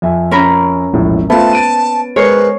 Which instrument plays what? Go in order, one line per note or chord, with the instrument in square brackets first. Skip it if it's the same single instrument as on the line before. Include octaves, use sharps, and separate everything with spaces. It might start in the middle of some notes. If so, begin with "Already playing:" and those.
[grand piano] F2 E5 G#5
[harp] C#4 A#4 B5
[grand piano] E1 A#1 A2
[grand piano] A3 F4 [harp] B3 [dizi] A5
[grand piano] A6 D7 D#7
[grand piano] G#3 A#4 C7 [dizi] B4 [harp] C#5